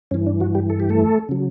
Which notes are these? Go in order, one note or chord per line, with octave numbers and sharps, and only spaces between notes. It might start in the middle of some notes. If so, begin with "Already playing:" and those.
G2 E3 C#4
D4
F#3 F#4
G3 G4
A4
G4
A3 A4
C#3 F#3